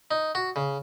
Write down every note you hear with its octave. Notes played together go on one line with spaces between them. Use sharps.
D#4
F#4
C#3